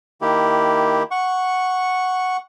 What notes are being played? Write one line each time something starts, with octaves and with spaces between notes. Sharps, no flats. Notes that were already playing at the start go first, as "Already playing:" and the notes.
D#3 A#3 E4 G4
F#5 C#6